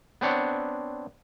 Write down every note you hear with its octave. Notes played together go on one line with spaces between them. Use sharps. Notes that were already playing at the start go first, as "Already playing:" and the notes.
B3 C4 D4 C#5 F#5